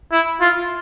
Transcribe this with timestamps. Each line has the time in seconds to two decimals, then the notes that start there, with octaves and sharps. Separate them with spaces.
0.12 E4
0.41 F4